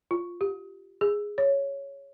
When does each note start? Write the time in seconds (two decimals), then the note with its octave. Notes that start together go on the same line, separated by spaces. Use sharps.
0.11 F4
0.41 G4
1.01 G#4
1.38 C#5